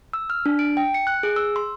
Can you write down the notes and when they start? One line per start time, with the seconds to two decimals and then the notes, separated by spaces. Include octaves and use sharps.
0.13 E6
0.30 F6
0.46 D4
0.59 D7
0.77 G5
0.94 C#7
1.07 F#6
1.23 G#4
1.36 E6
1.56 C6